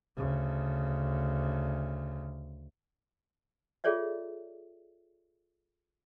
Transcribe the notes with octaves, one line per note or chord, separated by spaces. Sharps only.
D2 C#3
F4 G#4 A4 C#5 D5 E5